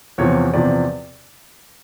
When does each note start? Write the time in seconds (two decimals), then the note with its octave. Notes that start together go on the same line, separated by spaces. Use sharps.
0.18 E2 C3 F3 C#5
0.54 E2 C3 F3 D5